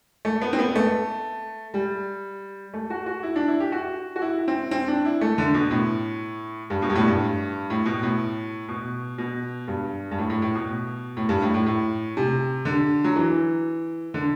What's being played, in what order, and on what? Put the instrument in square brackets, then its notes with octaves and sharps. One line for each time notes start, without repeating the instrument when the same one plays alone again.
[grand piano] A3
B3
C4
B3
A3
G3
A3
F#4
F#4
E4
D4
E4
G4
F#4
F#4
E4
C4
C4
D4
E4
A3
D3
B2
A2
G2
B2
G2
A2
G2
A2
B2
A2
B2
B2
G2
G2
A2
A2
A2
B2
A2
G2
A2
A2
A2
C3
D3
F#3
E3
D3